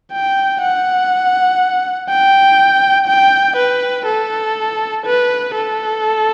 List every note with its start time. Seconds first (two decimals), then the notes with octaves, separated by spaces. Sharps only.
0.13 G5
0.62 F#5
2.09 G5
3.08 G5
3.57 B4
4.06 A4
5.06 B4
5.55 A4